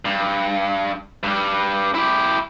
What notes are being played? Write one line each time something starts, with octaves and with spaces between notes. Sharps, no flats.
G2
G2 G3
E4 G4